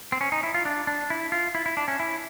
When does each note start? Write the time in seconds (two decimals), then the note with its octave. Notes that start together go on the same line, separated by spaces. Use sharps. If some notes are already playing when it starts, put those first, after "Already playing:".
0.12 C4
0.21 C#4
0.32 D#4
0.43 E4
0.54 F4
0.65 D4
0.87 D4
1.10 E4
1.32 F4
1.55 E4
1.66 E4
1.77 D4
1.88 C#4
2.00 E4